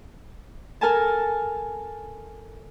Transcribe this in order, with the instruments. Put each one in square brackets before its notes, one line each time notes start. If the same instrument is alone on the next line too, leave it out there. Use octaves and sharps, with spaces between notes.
[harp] A4 A#4 G#5 A5